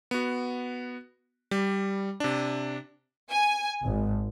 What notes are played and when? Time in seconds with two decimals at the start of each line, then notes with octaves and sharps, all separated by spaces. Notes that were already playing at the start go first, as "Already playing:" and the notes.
0.11 B3 F#4
1.51 G3
2.20 C3 D4
3.31 G#5
3.84 G#1